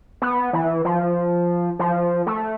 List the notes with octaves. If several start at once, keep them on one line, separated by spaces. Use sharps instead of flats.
B3
E3
F3
F3
A3